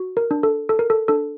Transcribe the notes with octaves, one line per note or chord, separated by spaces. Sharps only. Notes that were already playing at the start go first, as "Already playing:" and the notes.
Already playing: F#4
A#4
D4
A4
A4
A#4
A4
D4 A4